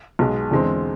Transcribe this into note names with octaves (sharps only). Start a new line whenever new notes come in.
B1 B2 G#3
E2 D3 G#3 C4